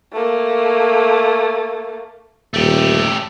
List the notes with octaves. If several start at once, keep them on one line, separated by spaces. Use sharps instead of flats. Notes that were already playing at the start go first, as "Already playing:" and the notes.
A3 A#3
D#1 A3 G4